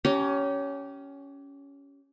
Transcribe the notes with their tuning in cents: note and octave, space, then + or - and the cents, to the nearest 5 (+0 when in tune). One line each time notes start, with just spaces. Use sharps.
C#4 +15 G4 -20 A#5 +0